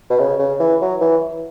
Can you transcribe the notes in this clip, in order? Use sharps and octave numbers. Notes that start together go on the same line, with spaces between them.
B2
C#3
C#3
E3
F#3
E3